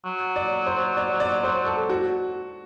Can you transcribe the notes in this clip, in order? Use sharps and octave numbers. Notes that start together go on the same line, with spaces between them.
F#3
D5
C5
D5
D5
C5
A4
F#4